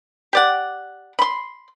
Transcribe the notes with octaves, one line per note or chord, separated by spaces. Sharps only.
G4 D5 F#5
B5 C6